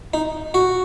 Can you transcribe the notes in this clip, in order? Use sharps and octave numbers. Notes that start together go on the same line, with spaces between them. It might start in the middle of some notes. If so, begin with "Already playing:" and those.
D#4
F#4